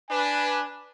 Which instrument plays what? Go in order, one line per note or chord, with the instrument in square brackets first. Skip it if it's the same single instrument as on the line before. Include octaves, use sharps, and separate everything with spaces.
[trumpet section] D4 B4 [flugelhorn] G#5